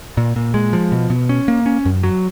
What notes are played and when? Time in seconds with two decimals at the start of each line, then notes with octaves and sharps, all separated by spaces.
0.17 A#2
0.36 A#2
0.54 G#3
0.73 F3
0.92 B2
1.10 B2
1.29 C#4
1.48 A#3
1.66 C#4
1.85 F#2
2.03 F#3